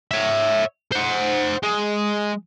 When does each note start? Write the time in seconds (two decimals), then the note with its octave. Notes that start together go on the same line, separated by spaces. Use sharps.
0.11 C#5 E5
0.92 C5 F#5
1.63 G#3